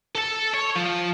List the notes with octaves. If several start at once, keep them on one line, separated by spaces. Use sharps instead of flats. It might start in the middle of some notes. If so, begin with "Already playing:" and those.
A4 A5
C#5
F3